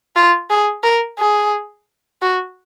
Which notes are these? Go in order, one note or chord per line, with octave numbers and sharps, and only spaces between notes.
F4
G#4
A#4
G#4
F#4